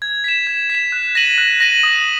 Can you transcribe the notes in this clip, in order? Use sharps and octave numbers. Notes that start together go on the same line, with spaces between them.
G#6
B6 E7
G#6
B6
E7
F#6
A#6 D#7 F#7
F#6
A#6 D#7 F#7
D#6